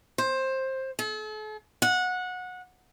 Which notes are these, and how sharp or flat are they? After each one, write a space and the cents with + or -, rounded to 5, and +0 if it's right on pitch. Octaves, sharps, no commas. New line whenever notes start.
C5 +15
A4 -45
F#5 -20